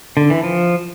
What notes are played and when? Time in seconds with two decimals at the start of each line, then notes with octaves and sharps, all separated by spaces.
0.17 D3
0.30 E3
0.43 F3